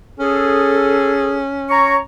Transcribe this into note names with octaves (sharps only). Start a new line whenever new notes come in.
C#4 G#4 A4
C#5 A#5 C#6